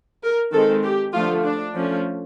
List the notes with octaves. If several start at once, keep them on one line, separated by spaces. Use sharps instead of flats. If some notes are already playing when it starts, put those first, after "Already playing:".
A#4
D#3 G#3 C4 A4
G4
D3 F3 A3 F4
D4
F3 A3 C#4